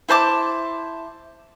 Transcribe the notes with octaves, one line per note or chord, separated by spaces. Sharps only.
E4 C5 A5 D6